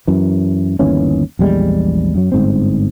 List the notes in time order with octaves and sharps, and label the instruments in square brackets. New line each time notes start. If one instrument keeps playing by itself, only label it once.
[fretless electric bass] F#2 E3
G1 D#2 E3 C#4
A#1 E2 G3 G#3
F#2 F#3
G1 G#2 C4